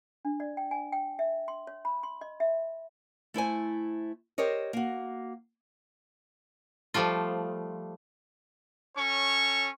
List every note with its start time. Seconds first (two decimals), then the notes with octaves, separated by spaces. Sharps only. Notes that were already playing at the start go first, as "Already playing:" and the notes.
0.25 D4
0.40 D5
0.57 G5
0.71 G#5
0.92 G5
1.19 E5
1.48 C6
1.67 C#5
1.85 B5
2.03 C6
2.21 D#5
2.40 E5
3.34 A3 E4 C5 G#5
4.38 G4 A#4 C5 C#5 D#5
4.73 A#3 F#4
6.94 F3 G3 A3 F4
8.97 C#4 A4 C#5 C#6